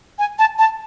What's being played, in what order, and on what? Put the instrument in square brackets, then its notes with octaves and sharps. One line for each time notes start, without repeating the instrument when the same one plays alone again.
[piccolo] G#5
A5
A5